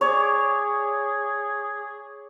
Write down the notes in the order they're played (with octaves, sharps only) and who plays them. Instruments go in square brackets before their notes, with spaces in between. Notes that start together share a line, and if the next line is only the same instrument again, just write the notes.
[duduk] G#4 [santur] C#5 D5